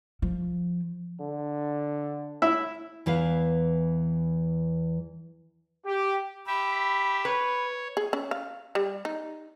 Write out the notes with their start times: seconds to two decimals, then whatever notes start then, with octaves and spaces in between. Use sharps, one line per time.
0.22 F3
1.20 D3
2.42 E4 E5
3.06 E2 E3 B4 F5
5.86 G4
6.47 G4 E5 B5
7.25 B4 C#5
7.97 G#4
8.13 C#4
8.31 F5
8.75 G3
9.05 D#4